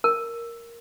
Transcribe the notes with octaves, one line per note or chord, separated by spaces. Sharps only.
A#4